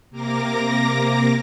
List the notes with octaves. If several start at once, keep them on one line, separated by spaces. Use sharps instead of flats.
C3 A#3 A#4 D6 A#6